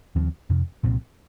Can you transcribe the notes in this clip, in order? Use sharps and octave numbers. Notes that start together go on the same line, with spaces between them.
D#2 C#3 F3 C4
F2 C3 F3
C2 A#2 F3 C4